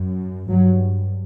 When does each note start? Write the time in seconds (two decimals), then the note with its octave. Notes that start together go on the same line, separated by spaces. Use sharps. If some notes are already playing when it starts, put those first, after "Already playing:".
Already playing: F#2
0.51 G2 F#3